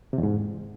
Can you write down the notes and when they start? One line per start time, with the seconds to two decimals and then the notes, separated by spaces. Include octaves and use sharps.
0.13 C3
0.18 E2
0.23 G#2